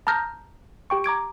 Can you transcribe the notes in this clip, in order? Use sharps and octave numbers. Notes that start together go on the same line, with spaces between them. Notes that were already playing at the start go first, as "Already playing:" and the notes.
A5 A#5 D#6 F6 G6 A#6
G4 G5 C#6
A#5 D6 G#6 D7